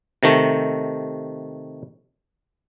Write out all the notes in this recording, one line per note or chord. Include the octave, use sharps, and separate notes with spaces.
C3 D#3 A3